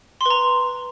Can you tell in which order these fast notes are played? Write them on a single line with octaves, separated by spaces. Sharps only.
C6 B4 A#5